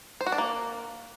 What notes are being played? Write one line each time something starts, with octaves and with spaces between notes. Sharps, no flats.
C5
F#4
D4
A#3